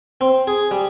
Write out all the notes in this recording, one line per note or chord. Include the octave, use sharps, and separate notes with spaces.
C4
G#4
G3